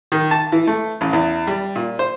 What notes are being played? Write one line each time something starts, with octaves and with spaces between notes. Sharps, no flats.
D#3
A5
E3
A3
A1
E2
G3
A#2
C5